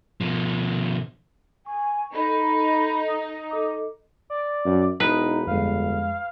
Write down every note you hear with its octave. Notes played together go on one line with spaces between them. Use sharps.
B2 F3
G#5 C#6
D#4 A4 B5
D#6
A4 D#5 D6
D5
F#2
E1 D#4 B4
G1 F2 G#3 F5